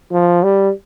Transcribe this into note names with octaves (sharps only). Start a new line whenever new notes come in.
F3
G3